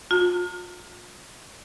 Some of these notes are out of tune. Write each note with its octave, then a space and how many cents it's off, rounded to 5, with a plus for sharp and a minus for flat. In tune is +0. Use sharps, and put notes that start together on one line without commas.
F4 +45 A#5 -45